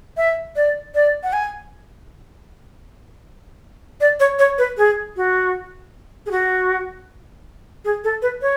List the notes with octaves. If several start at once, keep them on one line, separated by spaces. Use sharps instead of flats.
E5
D5
D5
F#5
G#5
D5
C#5
C#5
B4
G#4
F#4
G#4
F#4
G#4
A4
B4
C#5